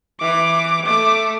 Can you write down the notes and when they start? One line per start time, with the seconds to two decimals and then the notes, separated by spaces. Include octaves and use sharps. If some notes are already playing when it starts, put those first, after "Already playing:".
0.21 E3 D6
0.87 A3 D6